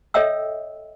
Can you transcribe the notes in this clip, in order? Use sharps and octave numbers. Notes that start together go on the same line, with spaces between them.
A4 C#5 D#5 E5 G5 E6